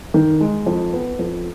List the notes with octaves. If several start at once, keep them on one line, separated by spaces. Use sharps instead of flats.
D#3
G#3
F2
B3
F2